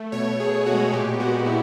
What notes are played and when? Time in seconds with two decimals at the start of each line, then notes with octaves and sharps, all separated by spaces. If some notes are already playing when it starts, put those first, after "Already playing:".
Already playing: A3
0.12 B2 C#5
0.32 B2
0.40 G#4
0.52 B2
0.66 F#4
0.73 G#3
0.92 A#2 G4
1.14 B3
1.20 F#4
1.33 A#2
1.46 E4